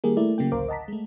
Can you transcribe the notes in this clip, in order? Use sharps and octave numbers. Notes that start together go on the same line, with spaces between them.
D#3 G3 A#3 G4 G#4 A#4
A3 E4 A#4 D5
C#3 F#3 A#3 G5
A1 D2 A#4 C5 F5 D6
D#5 F#5 A5 A#5 B6
G#3 A3